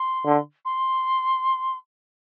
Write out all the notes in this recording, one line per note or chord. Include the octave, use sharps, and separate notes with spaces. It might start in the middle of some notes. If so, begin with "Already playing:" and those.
Already playing: C6
D3
C6